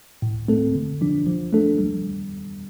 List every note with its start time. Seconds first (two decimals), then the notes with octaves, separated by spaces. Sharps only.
0.22 A2
0.48 A3 C4 A4
0.75 D3
1.01 F3 D4
1.26 F3
1.53 A3 D4 A4
1.78 G3